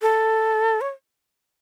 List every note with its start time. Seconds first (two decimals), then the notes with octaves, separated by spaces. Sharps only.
0.02 A4
0.81 C#5